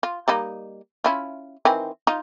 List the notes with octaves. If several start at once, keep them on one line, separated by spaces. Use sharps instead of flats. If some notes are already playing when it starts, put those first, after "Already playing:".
F4
G3 A#3 D#4
C#4 E4 F4
D#3 E3 C4
D#4 F4